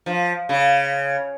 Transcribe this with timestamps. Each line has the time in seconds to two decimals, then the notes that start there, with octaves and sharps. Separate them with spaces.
0.06 F3
0.49 C#3